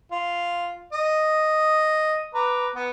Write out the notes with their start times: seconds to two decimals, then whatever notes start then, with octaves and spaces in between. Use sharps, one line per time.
0.12 F4
0.93 D#5
2.34 B4 A#5 D6
2.75 B3